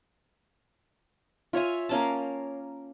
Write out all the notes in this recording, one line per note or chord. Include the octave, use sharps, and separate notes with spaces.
F4 C#5 E5 G#5
A#3 C#4 A5